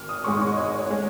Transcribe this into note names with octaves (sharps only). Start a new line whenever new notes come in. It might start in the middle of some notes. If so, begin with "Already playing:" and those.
Already playing: G#1 F6
D#6
G#2 G#3 C#4 C#6
C#6
D#5
G#1 C#5
C#5
G#3 C#4